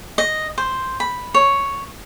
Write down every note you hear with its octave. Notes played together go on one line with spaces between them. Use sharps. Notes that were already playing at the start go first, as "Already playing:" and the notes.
D#5
C5
B5
C#5